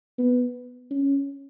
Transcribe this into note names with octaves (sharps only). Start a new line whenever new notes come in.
B3
C#4